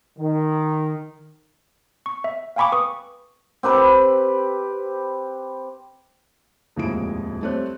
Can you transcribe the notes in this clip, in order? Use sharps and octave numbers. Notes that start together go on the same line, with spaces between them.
D#3
C#6
E5
F5 G5 G#5 B5 C#6 D6
B4 C#6 D#6
C4 G4 B4 B5
D#1 F2 A2 G#3 E4 D7
G3 A3 C4 C#5 F#6